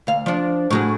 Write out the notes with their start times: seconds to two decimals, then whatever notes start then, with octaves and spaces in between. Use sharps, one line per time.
0.07 D2 F5
0.26 F3 D4
0.70 A2 F#3 G#4